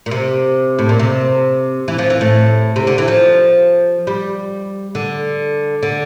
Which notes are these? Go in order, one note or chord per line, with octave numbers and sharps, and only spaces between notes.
A#2
C3
A2
A#2
C3
E3
F3
E3
A2
C3
D3
E3
F3
G3
D3
D3